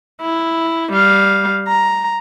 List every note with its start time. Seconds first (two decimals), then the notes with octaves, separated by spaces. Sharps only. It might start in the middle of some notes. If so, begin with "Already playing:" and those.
0.21 E4
0.92 G3 F5
1.68 A#5